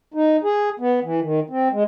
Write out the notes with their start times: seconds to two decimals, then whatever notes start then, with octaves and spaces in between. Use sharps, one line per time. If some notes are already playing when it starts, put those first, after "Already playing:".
0.14 D#4
0.44 G#4
0.80 B3
1.04 E3
1.22 D#3
1.50 C4
1.72 G#3